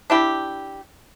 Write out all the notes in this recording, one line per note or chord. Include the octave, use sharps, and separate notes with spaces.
D4 E4 G4